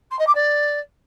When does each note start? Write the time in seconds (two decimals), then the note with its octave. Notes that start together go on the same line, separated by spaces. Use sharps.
0.11 C6
0.19 D#5
0.27 D6
0.35 D5